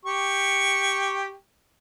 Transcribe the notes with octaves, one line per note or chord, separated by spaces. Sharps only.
G4 C#6